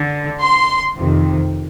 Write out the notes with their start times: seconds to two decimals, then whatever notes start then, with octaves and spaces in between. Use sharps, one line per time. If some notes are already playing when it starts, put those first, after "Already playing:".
Already playing: D3
0.41 C6
0.96 F2 C3 D#3